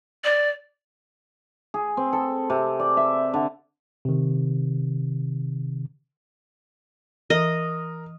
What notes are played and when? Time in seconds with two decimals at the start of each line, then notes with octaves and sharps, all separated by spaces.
0.24 D5
1.74 G#4
1.97 C4
2.13 A4
2.50 C3
2.80 D5
2.97 E5
3.34 D3
4.05 C3 D#3
7.30 E3 A#4 D#5